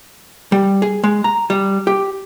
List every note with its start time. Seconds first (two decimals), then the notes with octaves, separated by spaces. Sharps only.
0.52 G3
0.82 G#4
1.03 G#3
1.24 A#5
1.50 G3
1.87 G4